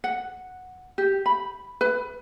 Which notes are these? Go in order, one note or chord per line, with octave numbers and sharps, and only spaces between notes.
F#5
G4
B5
B4